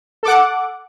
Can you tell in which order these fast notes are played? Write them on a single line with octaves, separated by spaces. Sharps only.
A4 D6 F#5